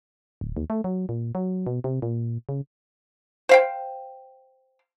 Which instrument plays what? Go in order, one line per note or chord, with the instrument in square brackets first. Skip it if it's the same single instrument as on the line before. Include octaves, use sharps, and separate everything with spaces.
[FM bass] D1
D#2
A3
F#3
A#2
F#3
B2
C3
A#2
C#3
[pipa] C5 F5 G5